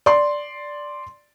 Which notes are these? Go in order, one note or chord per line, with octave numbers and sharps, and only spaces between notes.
D5 C6